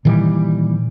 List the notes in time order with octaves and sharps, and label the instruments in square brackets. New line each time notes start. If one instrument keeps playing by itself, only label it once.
[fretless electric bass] A#2 D#3 E3 G3